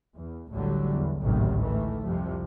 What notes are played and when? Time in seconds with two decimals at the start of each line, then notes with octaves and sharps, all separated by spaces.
0.17 E2
0.52 A1 D2 D3 F#3 G3
0.92 E2
1.23 A1 D2 G#2 C3 D#3 F#3
1.61 D#3 E3 A3
2.04 C2 F2 C3 F3